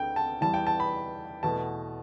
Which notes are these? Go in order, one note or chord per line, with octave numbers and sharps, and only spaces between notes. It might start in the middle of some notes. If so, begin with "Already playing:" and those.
Already playing: D2 D3 A3 G5
A5
E2 E3 G3 A5
G5
A5
B5
E2 B2 A3 A5